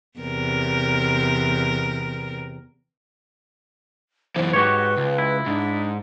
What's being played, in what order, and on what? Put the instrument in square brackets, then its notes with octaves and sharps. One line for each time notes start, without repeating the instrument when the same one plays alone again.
[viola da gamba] E2 C3 A#4
[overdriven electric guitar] F#2 E3 [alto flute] C5
[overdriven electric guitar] G#2 [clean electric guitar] F#4 G4 C#5 [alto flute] B4
[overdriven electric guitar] C#2
[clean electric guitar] E4
[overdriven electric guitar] G#2 [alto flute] D4